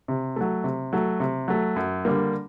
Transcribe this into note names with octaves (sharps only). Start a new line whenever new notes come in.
C3
F#3 A3
C3
F#3 A3
C3
F#3 A3
F#2
D3 G3 A#3